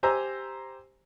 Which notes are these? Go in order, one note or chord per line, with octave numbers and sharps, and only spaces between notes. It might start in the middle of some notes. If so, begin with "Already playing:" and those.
G4 C5 G#5 A#5 E6